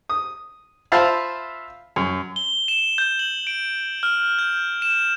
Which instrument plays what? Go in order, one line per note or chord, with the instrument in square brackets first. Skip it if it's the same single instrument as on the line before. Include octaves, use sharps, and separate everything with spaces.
[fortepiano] D#6
F4 C5 E5 F5 A5 B5
F#2
[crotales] G7
E7
G6
F#7
D7
F6
G6
E7